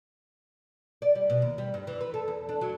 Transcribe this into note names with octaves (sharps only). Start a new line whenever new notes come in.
D5
G3
B2
D#2
G3
G2
E3
B4
A4
E2
D4
F#3